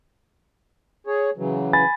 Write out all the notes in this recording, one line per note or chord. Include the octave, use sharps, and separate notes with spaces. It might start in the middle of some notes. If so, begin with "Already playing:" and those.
G#4 C#5
C#3 E3 F#3
G#5 B5 A6